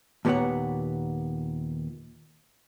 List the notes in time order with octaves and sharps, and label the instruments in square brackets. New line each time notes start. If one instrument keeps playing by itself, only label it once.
[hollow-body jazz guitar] D#2 A#2 B3 G4 C#5 F#5